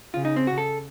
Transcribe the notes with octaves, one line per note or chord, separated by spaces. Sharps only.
C#3 F4
D#4
C4
F#4
A4